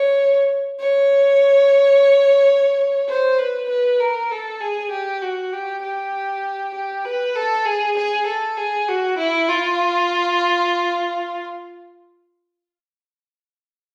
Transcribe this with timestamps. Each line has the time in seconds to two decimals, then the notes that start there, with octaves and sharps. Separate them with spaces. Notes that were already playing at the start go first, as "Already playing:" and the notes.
Already playing: C#5
0.79 C#5
3.09 C5
3.38 B4
3.69 B4
4.00 A#4
4.31 A4
4.61 G#4
4.91 G4
5.22 F#4
5.52 G4
5.82 G4
6.74 G4
7.05 B4
7.35 A4
7.65 G#4
7.97 G#4
8.26 A4
8.57 G#4
8.88 F#4
9.18 E4
9.49 F4